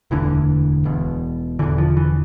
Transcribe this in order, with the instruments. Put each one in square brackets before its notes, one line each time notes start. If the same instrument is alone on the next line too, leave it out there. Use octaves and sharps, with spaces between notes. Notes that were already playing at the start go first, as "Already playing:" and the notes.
[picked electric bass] E1 D2 D3 E3
E1 E2 B2
E1 E2 D3 E3
F3
E3